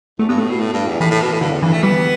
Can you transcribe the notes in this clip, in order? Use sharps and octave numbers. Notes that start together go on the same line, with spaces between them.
E2 A3
G2 B3
A2 A3
B2
A2
G2
E2
A2 E3
A2
B2
A2
G2 D3
E2
G2 E3
A3
G3 B3